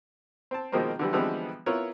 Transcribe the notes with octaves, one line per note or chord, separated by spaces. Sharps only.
C4 A5
B2 D#3 F3 G#3 A#3 C4
D3 E3 G3
D3 E3 F3 G3 G#3 B3
B3 E4 F4 A#4 C#5